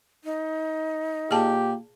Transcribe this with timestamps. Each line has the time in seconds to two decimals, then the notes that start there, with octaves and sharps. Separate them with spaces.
0.24 D#4
1.31 A#2 G4 G#4 A5